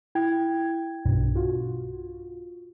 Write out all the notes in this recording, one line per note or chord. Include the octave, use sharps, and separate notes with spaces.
E4 G5 G#6
B1 G2 B2 D4
F4 F#4